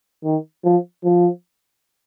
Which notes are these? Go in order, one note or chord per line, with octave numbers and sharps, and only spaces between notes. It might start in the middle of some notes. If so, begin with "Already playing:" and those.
D#3
F3
F3